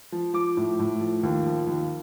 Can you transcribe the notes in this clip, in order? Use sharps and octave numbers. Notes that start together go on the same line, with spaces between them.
F3
F3 D6
A2
A2
F3
D#2
F3
D#2